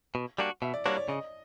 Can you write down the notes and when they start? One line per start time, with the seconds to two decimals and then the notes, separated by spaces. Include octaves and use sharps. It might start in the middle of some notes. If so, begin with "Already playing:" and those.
0.15 B2
0.38 G3 A#3 D4 F#4
0.62 B2 E5
0.74 D5
0.86 G3 A#3 D4 F#4 C#5
0.97 D5
1.08 C#3 D#5